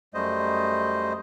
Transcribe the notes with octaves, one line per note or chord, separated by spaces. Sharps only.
F#2 G3 A3 C5 D#5